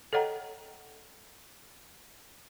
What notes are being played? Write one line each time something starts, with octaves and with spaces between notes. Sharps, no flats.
A4 C#5 D#5 F#5 G5 A#5